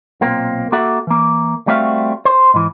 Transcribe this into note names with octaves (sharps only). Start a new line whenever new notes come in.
B1 A#2 A#3 C4
A#3 F#4 A4 E5 F#5
E3 A#3
G3 A3 C4 F#4 E5 F5
C5
G#2 E3